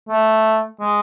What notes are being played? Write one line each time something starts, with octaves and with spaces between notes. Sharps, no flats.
A3
G#3